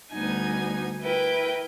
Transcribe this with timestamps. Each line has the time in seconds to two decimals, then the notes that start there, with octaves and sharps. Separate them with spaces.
0.12 D2 G3 B3 D#4 G#5
1.01 E4 A#4 B4 G5